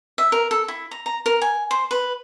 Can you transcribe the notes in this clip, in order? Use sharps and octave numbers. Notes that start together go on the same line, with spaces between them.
E5
A#4
A4
E4
A#5
A#5
A#4
G#5
C5
B4